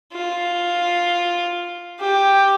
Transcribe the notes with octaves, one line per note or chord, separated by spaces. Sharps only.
F4
G4